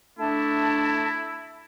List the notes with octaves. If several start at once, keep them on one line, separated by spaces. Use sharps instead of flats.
A3 D4 E4 A5